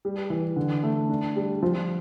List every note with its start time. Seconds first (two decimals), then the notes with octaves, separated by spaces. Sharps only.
0.05 G3
0.30 E3
0.56 D3
0.83 A3
1.09 D4
1.36 G3
1.63 F3